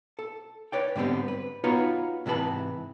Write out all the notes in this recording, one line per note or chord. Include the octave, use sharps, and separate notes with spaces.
A4
B4 C#5 D5 G5
G#2 D3 G3 B3 C4 G4
B4
B3 D#4 F4 F#4 B4 C#5
G#2 C3 E3 A4 B4 A5